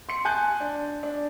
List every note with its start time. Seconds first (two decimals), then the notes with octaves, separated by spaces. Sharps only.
0.09 C6 C#7
0.25 G#5 A5 F#6 G6
0.60 D4
1.03 D4